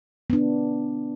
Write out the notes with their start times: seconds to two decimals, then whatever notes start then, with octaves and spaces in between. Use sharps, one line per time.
0.30 B3 D4